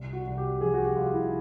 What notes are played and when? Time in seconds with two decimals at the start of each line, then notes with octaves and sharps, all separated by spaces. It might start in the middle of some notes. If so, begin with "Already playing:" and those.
Already playing: C2
0.13 F#4
0.25 C2
0.38 G4
0.60 F3 G#4
0.74 F#4
0.78 G4
0.96 C2 F4
1.14 E4